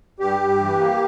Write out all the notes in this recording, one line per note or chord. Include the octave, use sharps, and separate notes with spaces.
G2 G4
G2
E3
A#3